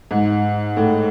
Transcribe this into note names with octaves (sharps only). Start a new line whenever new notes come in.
G#2
A2